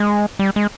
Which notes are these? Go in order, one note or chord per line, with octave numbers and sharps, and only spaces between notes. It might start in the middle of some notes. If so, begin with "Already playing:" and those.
Already playing: G#3
G3
G#3